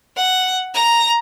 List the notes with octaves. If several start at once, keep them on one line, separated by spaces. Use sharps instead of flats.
F#5
A#5